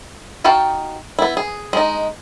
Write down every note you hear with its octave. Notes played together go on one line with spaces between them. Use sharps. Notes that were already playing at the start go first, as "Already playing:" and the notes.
D#4 F#4 F5 G5 A5
B3 E4
G#4
G#3 D#4